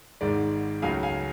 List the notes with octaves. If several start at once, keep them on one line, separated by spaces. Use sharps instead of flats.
G#1 G#2 G#3 D5
C#2 C#3 F#3 A3 F5 G#5
F5 G#5